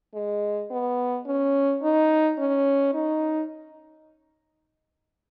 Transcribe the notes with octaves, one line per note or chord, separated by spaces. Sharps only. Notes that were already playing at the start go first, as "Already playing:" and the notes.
G#3
B3
C#4
D#4
C#4
D#4